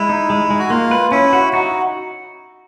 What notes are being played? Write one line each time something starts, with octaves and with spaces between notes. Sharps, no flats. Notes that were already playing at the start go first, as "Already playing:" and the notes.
Already playing: G#3 E4
D#4
G#3
G#3
F#4
A#3 F4
B4
C#4 E4
F#4
D#4 F#4